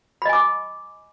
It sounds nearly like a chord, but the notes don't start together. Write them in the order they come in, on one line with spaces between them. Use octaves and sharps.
B5 D#5 G#5 D6